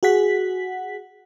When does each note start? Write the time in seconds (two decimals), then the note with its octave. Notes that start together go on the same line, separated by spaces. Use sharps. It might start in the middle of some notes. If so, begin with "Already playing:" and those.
0.03 F#4 G#4 F#5 B6